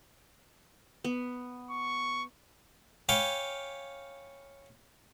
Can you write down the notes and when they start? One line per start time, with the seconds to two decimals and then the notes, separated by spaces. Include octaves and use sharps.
1.04 B3
1.70 C#6
3.09 C#5 F5 G5 G#5 B5 D6